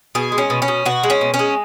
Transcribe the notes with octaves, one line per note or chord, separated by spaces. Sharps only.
B2 G#4
G#3
C#4
B2
C#4
B2
B2 F#4
G#3
C#4
B2
C#4
G#3